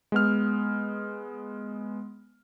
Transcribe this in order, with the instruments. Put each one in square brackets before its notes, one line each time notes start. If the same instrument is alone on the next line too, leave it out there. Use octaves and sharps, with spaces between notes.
[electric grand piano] G#3 B3 F6